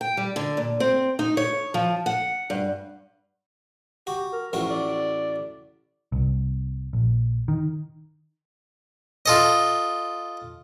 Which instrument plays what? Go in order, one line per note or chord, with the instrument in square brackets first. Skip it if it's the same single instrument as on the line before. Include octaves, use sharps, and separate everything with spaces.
[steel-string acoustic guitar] G5
G3
D3
A#2
C4
D#4
C#5
F3
F#5
G2
[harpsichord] F#4 [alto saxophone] G4
[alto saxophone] A#4
[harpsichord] A1 A2 F#4 [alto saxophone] F3
[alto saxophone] D5
[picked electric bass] C2
A#1
D#3
[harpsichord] F4 A4 D#5